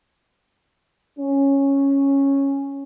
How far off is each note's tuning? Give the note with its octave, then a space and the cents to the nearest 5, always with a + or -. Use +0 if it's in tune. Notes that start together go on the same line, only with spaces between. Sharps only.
C#4 -5